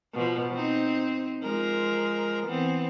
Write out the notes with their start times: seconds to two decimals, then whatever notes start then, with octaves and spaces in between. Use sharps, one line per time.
0.14 B2 F3
0.54 C4 D#4
1.43 F3 G#3 A#4
2.46 E3 B3 C4